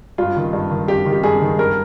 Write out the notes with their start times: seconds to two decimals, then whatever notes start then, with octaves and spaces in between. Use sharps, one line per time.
0.18 G2 F4
0.37 D#3
0.53 G2
0.71 D#3
0.88 G2 G4
1.06 D#3
1.13 G4
1.23 G2 G#4
1.41 D#3
1.59 G2 A#4